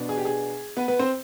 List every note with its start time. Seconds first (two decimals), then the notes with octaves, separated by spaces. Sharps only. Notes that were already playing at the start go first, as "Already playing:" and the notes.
Already playing: B2 B3 D4
0.09 G#4
0.17 G4
0.25 G#4
0.77 B3 B4
0.88 B3 B4
0.99 C4 C5